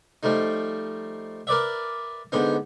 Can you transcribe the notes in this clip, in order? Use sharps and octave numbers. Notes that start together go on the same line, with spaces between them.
F3 G3 A3 D#4
A#4 B4 D5 E5
G#2 D3 B3 D#4